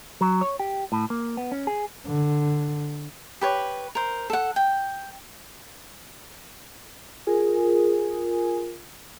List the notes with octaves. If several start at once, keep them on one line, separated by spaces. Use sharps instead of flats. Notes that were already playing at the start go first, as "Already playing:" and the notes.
F#3
C#5
G4
A2
A#3
B3
C#4
G#4
D3
G4 B4 C#5
A#4 C5
A4 F#5
G5
F4 G#4 A#4